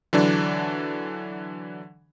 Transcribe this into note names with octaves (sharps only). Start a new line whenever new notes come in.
D3 E3 F#3 D4